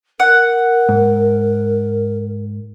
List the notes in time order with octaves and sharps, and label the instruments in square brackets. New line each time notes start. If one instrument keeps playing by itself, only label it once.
[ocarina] A#4 [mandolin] F#5
[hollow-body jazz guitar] G#2